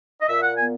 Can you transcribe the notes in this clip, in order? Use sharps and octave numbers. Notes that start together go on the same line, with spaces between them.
D#5
A#2 E5
F#5
B3 G#5